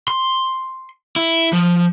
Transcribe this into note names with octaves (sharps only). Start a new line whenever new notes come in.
C6
E4
F3